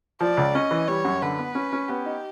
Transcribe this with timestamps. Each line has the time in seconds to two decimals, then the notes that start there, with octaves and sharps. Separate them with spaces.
0.21 F3 D5
0.37 C#2
0.55 C#4 D#5
0.71 E3
0.88 G3 C#5
1.05 F#2
1.22 D3 B4
1.39 B3
1.55 C#4
1.73 C#4
1.89 B3 G4
2.06 D#4